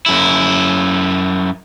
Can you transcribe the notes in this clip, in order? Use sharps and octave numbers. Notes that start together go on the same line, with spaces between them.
F#2 E4